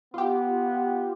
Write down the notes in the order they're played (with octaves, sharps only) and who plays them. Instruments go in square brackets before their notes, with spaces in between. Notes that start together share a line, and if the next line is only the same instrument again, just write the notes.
[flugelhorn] B3 [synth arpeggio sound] F4 G4